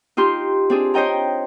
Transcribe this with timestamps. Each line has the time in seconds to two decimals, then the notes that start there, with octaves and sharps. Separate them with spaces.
0.17 D#4 F4 G4 C6
0.70 C4 D4 G#4
0.94 C5 C#5 D#5 G5 A#5